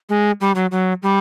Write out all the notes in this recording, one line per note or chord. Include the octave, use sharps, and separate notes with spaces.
G#3
G3
F#3
F#3
G3